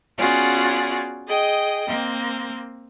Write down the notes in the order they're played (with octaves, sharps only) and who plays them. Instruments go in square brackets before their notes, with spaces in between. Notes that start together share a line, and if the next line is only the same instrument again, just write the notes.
[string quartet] B3 C#4 F4 F#4 G#4 D5
G#4 D#5 G5
A#3 C4